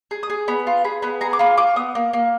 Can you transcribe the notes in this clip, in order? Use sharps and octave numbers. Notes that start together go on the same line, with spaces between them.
G#4
D#6
G#4
B3 B5
F4
G#4 B5
B3 B5
G#4 A#5
D6
F4 B5
F4 D6
B3 D#6
A#3
A#3